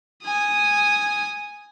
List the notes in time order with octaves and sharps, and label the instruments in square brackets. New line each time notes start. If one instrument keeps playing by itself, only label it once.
[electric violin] G#5 D#6